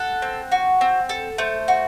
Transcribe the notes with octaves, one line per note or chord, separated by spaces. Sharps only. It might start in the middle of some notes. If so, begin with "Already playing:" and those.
Already playing: A4 F#5
C4
F#4
C4
A4
A3 C5
F#4